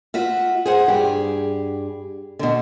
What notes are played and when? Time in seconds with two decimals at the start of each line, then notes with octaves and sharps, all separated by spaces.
0.14 F4 F#4 E5
0.65 G#4 C5 F#5
0.88 G2 G4 G#4
2.39 B2 D3